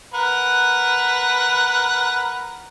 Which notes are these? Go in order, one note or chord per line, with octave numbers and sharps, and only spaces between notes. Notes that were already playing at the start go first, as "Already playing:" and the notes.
A#4 B4 F#5